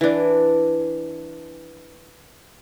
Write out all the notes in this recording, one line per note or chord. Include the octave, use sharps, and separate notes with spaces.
E3 D4